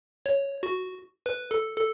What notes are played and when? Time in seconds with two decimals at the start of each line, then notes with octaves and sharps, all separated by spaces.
0.26 C#5
0.63 F#4
1.26 B4
1.51 A4
1.76 A4